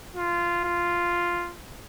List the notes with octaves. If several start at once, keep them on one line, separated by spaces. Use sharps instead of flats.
F4
F4